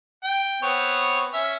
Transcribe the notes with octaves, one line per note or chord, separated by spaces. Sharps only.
G5
B3 C4 C#5
C#4 E5